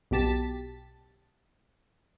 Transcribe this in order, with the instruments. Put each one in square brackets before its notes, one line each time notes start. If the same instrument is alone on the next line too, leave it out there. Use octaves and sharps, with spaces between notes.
[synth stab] B1 B2 G4 A5 A6 B6